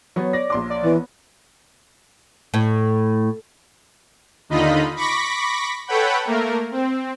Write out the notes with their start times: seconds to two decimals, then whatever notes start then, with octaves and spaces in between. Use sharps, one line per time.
0.16 F#3 B3 C#5
0.33 D5 A#6
0.50 A#1 C6 D6
0.70 D5
0.83 E3 B3
2.54 A2
4.49 D#2 D3 D#4 F4 D#5 B5
4.96 B5 C#6 D6 A#6 B6
5.87 A4 B4 C#5 F#5 G5 B5
6.25 A3 A#3 A#4
6.71 C4